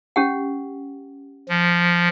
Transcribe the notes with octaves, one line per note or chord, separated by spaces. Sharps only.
C#4 G4 F#5
F3